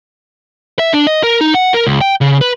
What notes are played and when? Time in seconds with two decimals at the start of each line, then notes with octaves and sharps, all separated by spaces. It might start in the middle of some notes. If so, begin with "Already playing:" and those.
0.79 E5
0.93 D4
1.07 D#5
1.23 A#4
1.41 D#4
1.54 F#5
1.74 A#4
1.87 C#2
2.01 G5
2.21 C#3
2.41 B4